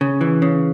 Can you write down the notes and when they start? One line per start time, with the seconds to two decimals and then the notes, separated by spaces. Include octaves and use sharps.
0.01 C#3
0.21 E3
0.42 C#3